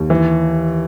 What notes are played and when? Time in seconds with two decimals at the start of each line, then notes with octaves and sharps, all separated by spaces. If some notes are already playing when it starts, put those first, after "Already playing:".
Already playing: D#2
0.10 E3